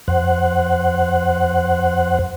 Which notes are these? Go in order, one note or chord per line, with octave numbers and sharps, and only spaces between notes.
F2 C5 F#5